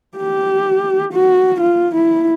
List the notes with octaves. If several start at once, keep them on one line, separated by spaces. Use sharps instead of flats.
G4
F#4
F4
E4